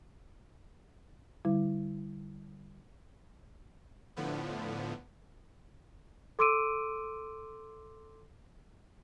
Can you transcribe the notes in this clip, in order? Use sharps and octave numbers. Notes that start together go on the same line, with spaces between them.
D3 G3 E4
A2 D3 F3 B3
A4 C6 D6 E6 D7 D#7